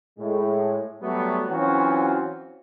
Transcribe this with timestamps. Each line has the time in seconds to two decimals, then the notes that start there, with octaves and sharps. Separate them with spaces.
0.19 A2 G#3
1.02 F#3 G3 A3 B3 F#4
1.48 E3 F#3 C4 C#4 F4 F#4